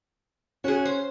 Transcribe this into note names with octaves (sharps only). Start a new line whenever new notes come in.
C#4 F#4 G#4
C5